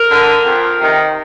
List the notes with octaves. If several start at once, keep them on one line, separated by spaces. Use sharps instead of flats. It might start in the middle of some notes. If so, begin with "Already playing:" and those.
Already playing: A#4
D3
F2
C3 D#3